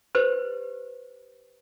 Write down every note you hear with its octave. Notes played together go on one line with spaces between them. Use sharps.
G4 B4 C5